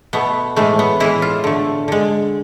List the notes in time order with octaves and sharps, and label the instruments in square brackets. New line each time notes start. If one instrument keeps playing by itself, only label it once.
[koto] B2 A3 B3
A2 E3 G#3 A3
B3
A2 E3 G#3 E4
F4
D3 A3
D3 G#3